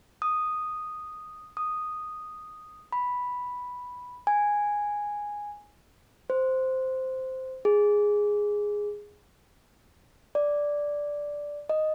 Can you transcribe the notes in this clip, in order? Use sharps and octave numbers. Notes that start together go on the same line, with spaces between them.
D#6
D#6
B5
G#5
C5
G#4
D5
D#5